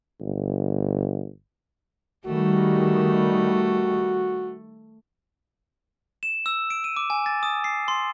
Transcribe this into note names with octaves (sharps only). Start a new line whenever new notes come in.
G1
D#3 G3 A3 F#4
E7
E6
D7
D#7
D6
G#5
A6
D#6
C7
C6